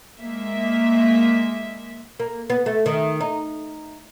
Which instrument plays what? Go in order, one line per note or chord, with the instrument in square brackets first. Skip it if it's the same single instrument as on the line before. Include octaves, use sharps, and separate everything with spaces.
[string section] G#3 A#3 E5
[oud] A#3
B3
A3
D#3
D#4